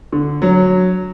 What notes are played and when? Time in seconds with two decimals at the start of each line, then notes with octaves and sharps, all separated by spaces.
0.12 D3
0.42 F#3